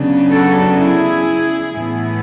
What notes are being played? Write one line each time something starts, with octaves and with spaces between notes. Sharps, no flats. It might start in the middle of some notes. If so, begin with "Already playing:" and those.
Already playing: C#3 F#3 B3 D4
F#4 A4
E4 G#4
A2 E3 B3 E4